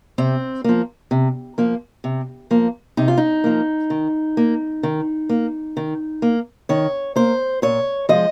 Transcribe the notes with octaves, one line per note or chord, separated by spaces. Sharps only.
C3 C4
F3 A#3
C3
F3 A#3
C3
F3 A#3
C3 D#4
F4
D#4
F3 A#3
D#3
A#3
D#3
A#3
D#3
A#3
D#3 C#5
A#3 C5
A#2 C#5
F3 G#3 D#5